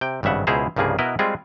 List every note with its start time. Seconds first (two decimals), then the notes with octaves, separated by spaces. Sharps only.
0.01 C3 G5
0.23 G#1 G2 C#3 E5 F#5
0.47 C#2 B2 E4 G#4 C5 A#5
0.76 C2 G2 C#3 F3 A#3 G#4
0.99 B2 B3 E4 A#4 B4 D#5
1.19 G3 G#3 C4 F4 G#4